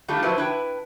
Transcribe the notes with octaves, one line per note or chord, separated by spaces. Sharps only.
D#3 G3 A3 D4 F4 G4
F3 F#3 E4 B4 C5
D4 E4 B4 G5